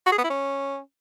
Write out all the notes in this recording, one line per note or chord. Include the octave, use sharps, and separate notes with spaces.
F#4
G#4
B3
E4
C#4